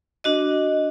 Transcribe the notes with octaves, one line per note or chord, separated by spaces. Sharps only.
D4 F#4 D#5